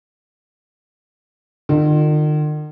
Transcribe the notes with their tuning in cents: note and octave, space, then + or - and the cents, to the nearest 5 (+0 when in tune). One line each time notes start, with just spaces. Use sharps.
D#3 -45 F4 +0